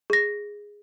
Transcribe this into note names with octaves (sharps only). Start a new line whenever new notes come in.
G#4 A#6